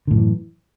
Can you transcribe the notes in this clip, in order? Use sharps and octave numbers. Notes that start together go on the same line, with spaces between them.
F#2 A2 D3 E3